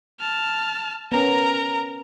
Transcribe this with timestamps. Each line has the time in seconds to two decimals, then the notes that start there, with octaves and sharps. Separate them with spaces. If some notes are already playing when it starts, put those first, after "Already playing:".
0.20 A5 F6
1.12 B3 C#4 A#4 A#5